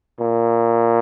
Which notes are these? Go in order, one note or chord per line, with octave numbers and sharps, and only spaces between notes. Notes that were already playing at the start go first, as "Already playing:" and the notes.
A#2